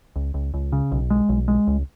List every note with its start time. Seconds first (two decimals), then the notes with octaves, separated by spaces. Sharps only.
0.16 C#2
0.34 C#2
0.54 C#2
0.72 C#3
0.92 B1
1.10 G#3
1.29 B1
1.48 G#3
1.67 C#2